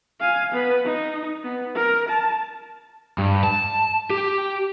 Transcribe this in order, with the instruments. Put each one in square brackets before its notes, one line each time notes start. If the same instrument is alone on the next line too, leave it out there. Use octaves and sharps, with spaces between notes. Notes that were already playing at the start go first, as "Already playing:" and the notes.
[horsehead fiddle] F5 G#5
B3 B4
D#4
B3
A#4
A5
[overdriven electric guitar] G2
A5
G4